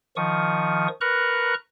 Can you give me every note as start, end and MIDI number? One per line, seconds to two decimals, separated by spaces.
0.16 0.88 51
0.16 0.88 53
0.16 0.88 85
0.16 0.88 87
1.01 1.54 70
1.01 1.54 71
1.01 1.54 82
1.01 1.54 85
1.01 1.54 90